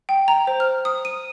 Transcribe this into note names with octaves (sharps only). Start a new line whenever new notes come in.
G5
A#5
C5
F6
D#6
D#7